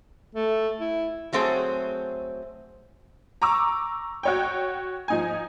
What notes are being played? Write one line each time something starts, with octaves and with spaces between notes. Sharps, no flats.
A3
E4
F#3 A3 C4 G#4 C5
A#5 C#6 D6 E6
F#4 C#5 G5
F3 D#4 G#5